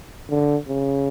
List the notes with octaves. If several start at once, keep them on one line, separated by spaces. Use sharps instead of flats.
D3
C#3